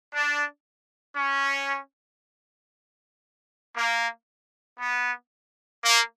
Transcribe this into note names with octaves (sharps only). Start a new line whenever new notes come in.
D4
C#4
A#3
B3
A#3